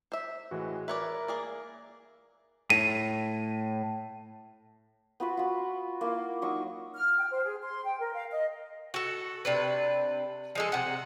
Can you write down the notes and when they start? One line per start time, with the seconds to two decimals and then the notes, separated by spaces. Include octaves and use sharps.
0.12 C5 E5
0.51 A2 E3 G#3 F#4
0.88 A#4 B4 C#5 D5 E5
1.28 A#3 G#4 D5
2.70 A2 D#7
5.20 B3 F4 F#4 B4
5.37 F4 F#4
6.01 A#3 E4
6.42 F#3 D#4 C#6
6.95 F6
7.19 G5
7.31 C5
7.44 G#4
7.62 C6
7.84 G5
7.99 A#4
8.14 F5
8.31 D#5
8.94 F#4 A4
9.45 C3 D4 B4
10.55 F3 G#3 A4
10.72 C3 F#5